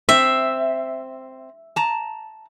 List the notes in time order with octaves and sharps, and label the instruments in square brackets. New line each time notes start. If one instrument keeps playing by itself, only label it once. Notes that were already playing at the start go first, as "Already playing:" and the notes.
[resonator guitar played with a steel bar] C4 [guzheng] E5
[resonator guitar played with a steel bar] A5 A#5